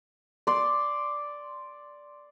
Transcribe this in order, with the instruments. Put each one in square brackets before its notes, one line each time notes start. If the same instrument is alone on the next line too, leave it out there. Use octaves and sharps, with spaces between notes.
[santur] D5 C6